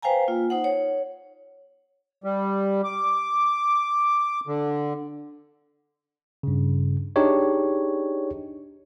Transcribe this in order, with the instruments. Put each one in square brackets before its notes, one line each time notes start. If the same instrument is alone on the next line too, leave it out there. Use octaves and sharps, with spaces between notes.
[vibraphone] B4 C5 F5 G5 G#5 A#5
A#3 F4
D#4 C5 F#5
C#5
[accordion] G3
D6
D3
[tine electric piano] G2 C#3
D4 D#4 G4 G#4 C#5